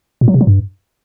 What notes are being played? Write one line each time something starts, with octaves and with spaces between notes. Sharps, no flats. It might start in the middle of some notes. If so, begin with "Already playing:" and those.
A#2
F#3
C3
F#3
G2